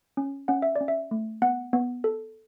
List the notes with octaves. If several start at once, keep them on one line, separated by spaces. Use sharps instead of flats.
C#4
C#4 F#5
E5
C#4 D5
E5
A3
B3 F#5
B3
A4